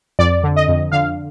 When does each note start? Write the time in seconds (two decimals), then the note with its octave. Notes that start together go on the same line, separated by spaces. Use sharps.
0.19 F2 D5
0.44 D3
0.56 D#5
0.69 F2
0.92 D3 F5